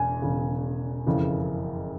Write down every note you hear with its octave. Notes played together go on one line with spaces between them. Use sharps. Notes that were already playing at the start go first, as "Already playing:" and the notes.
Already playing: E1 E2 C#3 G#5
E1 E2 C#3
F#1 F2 C#3 E3